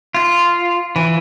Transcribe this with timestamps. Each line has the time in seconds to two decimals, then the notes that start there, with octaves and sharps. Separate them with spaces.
0.15 F4
0.96 E3